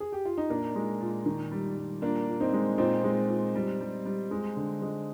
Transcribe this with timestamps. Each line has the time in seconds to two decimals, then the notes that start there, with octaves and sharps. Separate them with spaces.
0.00 G#4
0.12 G4
0.25 F4
0.38 D#4
0.49 A#2 A#3 D4
0.75 G#3
1.01 A#2
1.26 D#3
1.51 G3
1.77 G3
2.02 A#2 A#3 D4
2.28 A#2
2.40 C4 D#4
2.53 G#3
2.78 A#2 C4 D#4
3.04 G#3
3.29 A#2
3.55 G3
3.81 G3
4.06 G3
4.31 G#3
4.56 D3
4.82 G#3